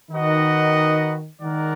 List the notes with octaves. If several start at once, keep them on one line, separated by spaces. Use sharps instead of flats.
D#3 D#4 F#4 B4 D#5 F#5
D#3 G#3 D#4 A#4 D5 F#5